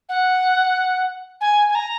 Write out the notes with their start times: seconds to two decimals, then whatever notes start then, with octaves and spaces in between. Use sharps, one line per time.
0.09 F#5
1.41 G#5
1.69 G#5
1.75 A#5